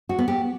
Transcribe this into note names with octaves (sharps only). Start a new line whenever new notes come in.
F#4
B3
G4